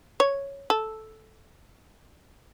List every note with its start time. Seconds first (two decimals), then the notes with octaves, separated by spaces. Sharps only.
0.20 C#5
0.70 A4